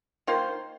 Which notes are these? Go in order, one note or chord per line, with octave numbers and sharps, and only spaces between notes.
D#3 A#3 F4 C5